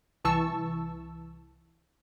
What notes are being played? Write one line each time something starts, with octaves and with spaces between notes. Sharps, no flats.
C2 E3 A5 C#6 E6